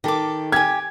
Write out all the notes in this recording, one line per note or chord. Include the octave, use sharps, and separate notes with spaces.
D#3 G4 A4 D6
G4 G#5 G#6